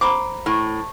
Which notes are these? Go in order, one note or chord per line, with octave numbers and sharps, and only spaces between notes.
C5 A#5 B5 D6
A2